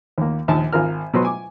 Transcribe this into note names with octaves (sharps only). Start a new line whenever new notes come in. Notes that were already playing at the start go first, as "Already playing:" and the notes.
D#2 A#3
A#1 D#2 G#5 A5
G#1 F4 A#4 F6
B2 F#3 B4 C5 C6
G#5 D6